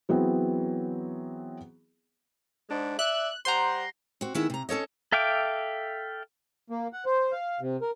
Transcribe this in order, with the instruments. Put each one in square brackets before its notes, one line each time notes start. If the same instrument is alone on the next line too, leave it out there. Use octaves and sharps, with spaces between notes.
[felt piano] E3 F#3 B3 C4 G#4
[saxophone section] G#2 G#3 D4
[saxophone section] D5 E5 [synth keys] F#6
[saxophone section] G3 C5 F#5 [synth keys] A#5 C6
[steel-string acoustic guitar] C4 F#4
D#3 B3 E4 G#4 E5
C3 A#5
C#4 A4 C#5 D#5
[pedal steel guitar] A4 E5 F5 G5 D6
[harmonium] A#3
F#5
C5
F5
C3
A#4